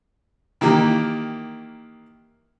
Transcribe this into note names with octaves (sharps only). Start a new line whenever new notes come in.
D#3 E3 A#3 G4